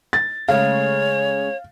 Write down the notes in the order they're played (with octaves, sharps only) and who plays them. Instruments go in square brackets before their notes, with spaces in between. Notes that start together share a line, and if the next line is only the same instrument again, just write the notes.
[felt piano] A6
[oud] C#3 G#3 A3 [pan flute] C#5 [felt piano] F5